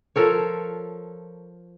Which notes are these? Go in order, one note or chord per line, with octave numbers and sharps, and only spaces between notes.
F3 A4 A#4 C#5